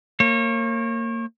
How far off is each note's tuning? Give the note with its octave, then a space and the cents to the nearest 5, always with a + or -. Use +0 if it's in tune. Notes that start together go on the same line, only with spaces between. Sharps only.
A#3 -25 C#5 -30